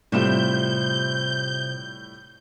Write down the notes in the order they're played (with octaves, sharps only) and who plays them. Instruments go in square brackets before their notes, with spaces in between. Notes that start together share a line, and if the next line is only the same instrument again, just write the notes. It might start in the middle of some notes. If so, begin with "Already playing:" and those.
[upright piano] A2 G3 E7 [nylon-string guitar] C3 F4 [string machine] G6